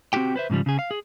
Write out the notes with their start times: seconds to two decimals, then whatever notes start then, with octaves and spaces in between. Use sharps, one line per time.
0.13 C4 D#4 F#4 G4 G5
0.36 B4 C5 E5
0.50 G#2 C#3 F3 G3
0.66 C#3 G#4
0.79 F5
0.91 G#4